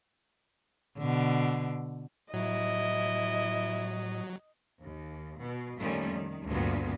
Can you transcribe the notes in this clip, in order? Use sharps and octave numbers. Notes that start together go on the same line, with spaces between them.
B2 D3
A2 F#3 E4 D#5
D#2
B2
F2 A#2 D#3 G3 A3 C#4
D#3
D2 G2 A#2 B3